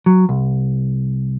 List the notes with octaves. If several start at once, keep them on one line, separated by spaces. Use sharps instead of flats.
F#3
C2